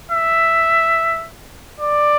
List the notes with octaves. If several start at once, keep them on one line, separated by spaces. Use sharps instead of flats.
E5
D5